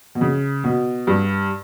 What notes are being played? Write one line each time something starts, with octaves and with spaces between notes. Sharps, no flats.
B2
C#3
B2
G2